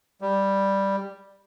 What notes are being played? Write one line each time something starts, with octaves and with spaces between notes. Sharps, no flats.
G3